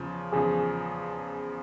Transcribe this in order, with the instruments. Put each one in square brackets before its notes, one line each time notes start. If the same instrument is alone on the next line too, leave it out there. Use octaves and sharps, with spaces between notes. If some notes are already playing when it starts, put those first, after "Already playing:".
Already playing: [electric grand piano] E2 C#3 F3
[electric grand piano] E2 C#3 F3 [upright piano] G#4